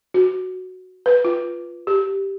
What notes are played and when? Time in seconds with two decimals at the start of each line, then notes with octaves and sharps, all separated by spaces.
0.14 F#4
1.06 B4
1.25 F4
1.87 G4